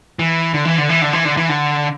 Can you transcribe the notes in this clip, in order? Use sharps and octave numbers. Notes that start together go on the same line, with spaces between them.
E3
D3
E3
D3
E3
D3
E3
D3
E3
D3